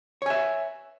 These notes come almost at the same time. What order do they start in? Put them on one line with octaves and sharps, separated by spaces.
C#5 G#5 E5